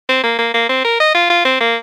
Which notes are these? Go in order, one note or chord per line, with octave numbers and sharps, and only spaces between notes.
C4
A#3
A#3
A#3
C4
A#4
D#5
F4
F4
C4
A#3